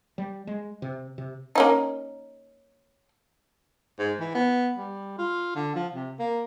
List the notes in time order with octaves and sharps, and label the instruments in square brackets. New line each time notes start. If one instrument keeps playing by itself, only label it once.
[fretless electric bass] G3
G#3
C3
C3
[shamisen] A#3 C#4 D#4
[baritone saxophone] G#2
E3
B3
G3
F4
D3
F3
C3
A#3